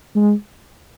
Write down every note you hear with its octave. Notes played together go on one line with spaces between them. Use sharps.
G#3